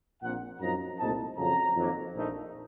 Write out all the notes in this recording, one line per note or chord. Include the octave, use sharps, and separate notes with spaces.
A#1 A#2 F3 C4 F#5
F#2 F3 C4 D#4 A#5
C2 A#2 A3 C4 D#4 A5
F2 C#3 F#3 A#5
F2 D#3 F#3 A#3
A#1 A#2 A3 D#4